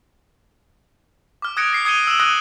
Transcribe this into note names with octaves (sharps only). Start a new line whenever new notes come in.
D6 F6
D#6 F#6 G#6 A#6 C#7 D7
A#6 C7 C#7
D#6 G#6 C#7 D#7 G7
E6 D7 E7 F#7
D#6 F#6 G#6 A#6 D7 D#7